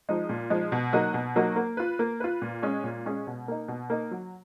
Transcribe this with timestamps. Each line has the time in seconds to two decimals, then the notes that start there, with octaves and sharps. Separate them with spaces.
0.09 F3 G#3 D#4
0.29 A#2
0.50 F3 G#3 D#4
0.72 B2
0.93 F#3 A#3 D#4 F#4
1.14 B2
1.36 F#3 A#3 D#4 F#4
1.56 A#3
1.77 F4 B4
1.99 A#3
2.20 F4 B4
2.42 A#2
2.62 G#3 C#4 G#4
2.84 A#2
3.06 G#3 C#4 G#4
3.27 B2
3.48 A#3 D#4
3.68 B2
3.90 A#3 D#4
4.11 F#3